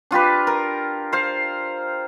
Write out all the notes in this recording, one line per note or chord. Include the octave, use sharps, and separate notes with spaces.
D4 F4 G4 B4
A#4
C5 F5